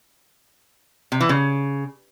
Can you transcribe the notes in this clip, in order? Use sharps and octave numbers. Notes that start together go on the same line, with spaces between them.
C3
E3
C#3